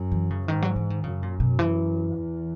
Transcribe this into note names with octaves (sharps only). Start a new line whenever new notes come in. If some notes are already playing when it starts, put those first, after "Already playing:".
Already playing: F#2
E3
C#3
G#2 D#3
F#3
E3
D#3
F#2 C#3
A#2
B2
E3
E2